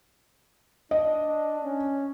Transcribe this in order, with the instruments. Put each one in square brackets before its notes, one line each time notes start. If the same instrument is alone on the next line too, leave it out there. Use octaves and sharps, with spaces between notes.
[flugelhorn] D4 [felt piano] D#5
[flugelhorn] C#4